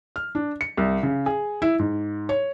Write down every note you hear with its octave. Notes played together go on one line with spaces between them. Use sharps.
F6
D4
C#7
C2
C#3
G#4
E4
G#2
C#5